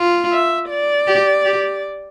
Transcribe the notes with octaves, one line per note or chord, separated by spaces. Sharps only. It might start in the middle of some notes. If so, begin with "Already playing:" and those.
Already playing: F4
E5
D5
G4
G4